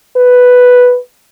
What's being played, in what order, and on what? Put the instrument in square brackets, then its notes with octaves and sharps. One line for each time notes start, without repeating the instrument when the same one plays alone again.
[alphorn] B4